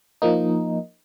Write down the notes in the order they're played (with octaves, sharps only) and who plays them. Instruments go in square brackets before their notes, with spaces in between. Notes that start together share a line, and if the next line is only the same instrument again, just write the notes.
[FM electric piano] F3 A#3 D#4